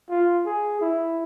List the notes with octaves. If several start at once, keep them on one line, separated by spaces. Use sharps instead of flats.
F4
G#4
E4